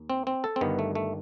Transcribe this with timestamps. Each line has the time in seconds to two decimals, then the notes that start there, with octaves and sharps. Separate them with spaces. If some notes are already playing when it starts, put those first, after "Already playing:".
Already playing: D#2
0.10 C4
0.27 C4
0.44 A4
0.56 C4
0.61 G1 G2 D#3 B3
0.79 A3
0.95 A3